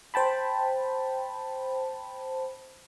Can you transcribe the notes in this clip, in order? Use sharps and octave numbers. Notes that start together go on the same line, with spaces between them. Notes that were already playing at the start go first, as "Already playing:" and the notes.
C5 G5 A5 B5